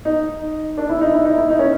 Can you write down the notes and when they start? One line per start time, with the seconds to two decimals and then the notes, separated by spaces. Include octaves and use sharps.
0.05 D#4
0.78 D4
0.89 E4
1.01 D#4
1.14 E4
1.25 D#4
1.38 E4
1.50 D#4
1.59 C#4